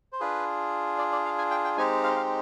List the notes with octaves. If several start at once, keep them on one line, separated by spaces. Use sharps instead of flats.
C5
D4 F4 G#4 B4
D5
D5
F5
G#5
G5
G5
G#3 C4 D#4 G4 G#5
F5
F5